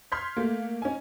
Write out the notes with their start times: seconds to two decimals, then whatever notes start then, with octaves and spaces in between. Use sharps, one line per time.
0.12 C6 F6 G6 G#6 B6
0.36 A3 A#3
0.82 C#4 D#4 G#5